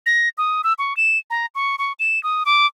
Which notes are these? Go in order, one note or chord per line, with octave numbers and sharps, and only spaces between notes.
A#6
D#6
E6
C#6
E7
A#5
C#6
C#6
E7
D#6
D6